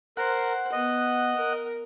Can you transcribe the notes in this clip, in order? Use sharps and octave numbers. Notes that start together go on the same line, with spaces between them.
A#4 C5 F#5
B3 D#5
A#4